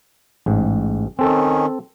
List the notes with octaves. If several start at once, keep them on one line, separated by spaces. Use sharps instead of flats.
A1 G#2
D#3 C4 C#4 A4